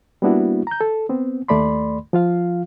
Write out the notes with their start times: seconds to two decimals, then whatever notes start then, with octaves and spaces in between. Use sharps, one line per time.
0.22 G3 A#3 B3 D4 E4 F#4
0.67 A#5 G6
0.81 A4
1.09 B3 C4
1.48 D#2 A3 D5 B5 C6
2.13 F3 F4 F5